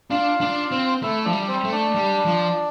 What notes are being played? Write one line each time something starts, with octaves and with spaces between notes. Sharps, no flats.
D4 F4 F5
D4
C4
A3 E4 E5
F3 D4 D5
G3
C4 C5
A3
D4 D5
G3
F3